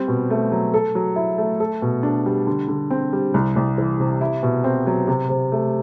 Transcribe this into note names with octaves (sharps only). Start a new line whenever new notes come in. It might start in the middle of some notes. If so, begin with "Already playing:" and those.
Already playing: G3 C4
B2
A3
F#3
A4
F#3
E4
A3
A4
B2
D4
G3
D3
D3
C4
G3
C2
C2
E3
C3
E4
B2
C4
F#3
C3
C3
A3